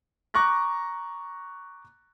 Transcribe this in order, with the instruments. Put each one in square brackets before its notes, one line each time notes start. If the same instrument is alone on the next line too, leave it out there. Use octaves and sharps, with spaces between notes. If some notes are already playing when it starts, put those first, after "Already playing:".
[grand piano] A#5 C#6 D6 F#6 A#6